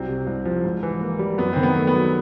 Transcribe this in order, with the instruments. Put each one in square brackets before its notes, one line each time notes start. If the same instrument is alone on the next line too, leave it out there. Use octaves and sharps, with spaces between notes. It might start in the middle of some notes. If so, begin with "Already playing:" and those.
Already playing: [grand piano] C2 F#3 [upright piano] C4
[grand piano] C3
C2
F3
G#2
E3
A#3
G3
[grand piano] F#2 [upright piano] B3
[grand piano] D#3 [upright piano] C4
[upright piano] B3
[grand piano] A3
[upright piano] B3
[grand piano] F#3